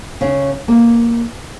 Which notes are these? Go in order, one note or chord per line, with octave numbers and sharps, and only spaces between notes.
C#3
A#3